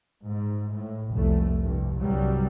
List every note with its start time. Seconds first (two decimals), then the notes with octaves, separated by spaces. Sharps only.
0.24 G#2
0.72 A2
1.12 F1 C2 A3
1.62 C2 G2
2.01 C2 G2 F#3 G3